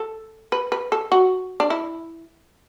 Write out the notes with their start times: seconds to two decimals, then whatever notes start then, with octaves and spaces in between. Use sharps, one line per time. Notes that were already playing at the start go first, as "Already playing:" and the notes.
Already playing: A4
0.52 B4
0.72 B4
0.92 A4
1.12 F#4
1.60 D4
1.70 E4